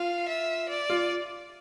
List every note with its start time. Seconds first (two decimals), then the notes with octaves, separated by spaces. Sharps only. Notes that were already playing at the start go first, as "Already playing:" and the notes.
Already playing: F4 F5
0.28 E5
0.69 D5
0.90 F4